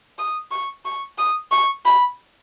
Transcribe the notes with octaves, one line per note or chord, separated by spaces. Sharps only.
D#6
C#6
C#6
D#6
C#6
B5